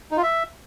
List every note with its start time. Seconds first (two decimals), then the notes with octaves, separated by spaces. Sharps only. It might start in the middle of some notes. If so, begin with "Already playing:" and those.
0.11 D#4
0.17 F4
0.23 E5